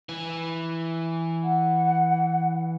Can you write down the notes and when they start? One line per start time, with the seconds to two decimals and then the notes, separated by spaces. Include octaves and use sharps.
0.09 E3
1.43 F#5